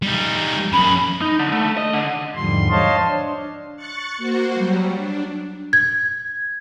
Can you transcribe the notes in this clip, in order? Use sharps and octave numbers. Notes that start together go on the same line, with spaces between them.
G3 D#4
F#2 C#3 B5
D#4
D3
A3
D#5
D3
E2 G#2 D3 F3 G3 C6
C5 C#5 D#5 F5 A5 C6
D4
C#6 F#6 A6 C#7
A#3 F#4 C5 F#5
F#3 G3
D4
G#6